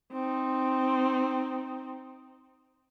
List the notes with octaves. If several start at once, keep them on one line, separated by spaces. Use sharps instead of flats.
C4 D#4